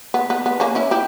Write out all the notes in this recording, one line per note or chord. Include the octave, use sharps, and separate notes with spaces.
B3
B3
B3
A#3 C#4
C#4 E4
E4 G4